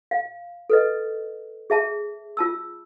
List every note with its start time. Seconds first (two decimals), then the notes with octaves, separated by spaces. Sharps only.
0.11 F5
0.70 A4 B4 D#5
1.70 G#4 E5 A5
2.37 F4 A5 E6